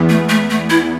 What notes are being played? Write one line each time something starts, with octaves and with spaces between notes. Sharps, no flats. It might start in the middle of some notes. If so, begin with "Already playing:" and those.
Already playing: E2 E3 B3
A3
A3
A3
E4